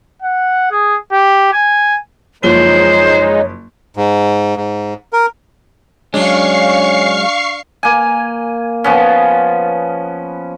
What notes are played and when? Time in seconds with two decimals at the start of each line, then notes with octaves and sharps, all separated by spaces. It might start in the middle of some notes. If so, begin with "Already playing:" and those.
0.22 F#5
0.71 G#4
1.12 G4
1.53 G#5
2.43 F#1 F3 G#3 D#4 C5 C#5 G7
3.97 G#2
4.57 G#2
5.13 A#4
6.14 F#3 G#3 C#4 D4 F5 C#6 C7
7.83 A#3 G#5
8.84 F3 B3 C#4